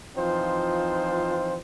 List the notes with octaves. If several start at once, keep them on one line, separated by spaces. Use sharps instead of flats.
E3 F3 C4 D#4 F4 C5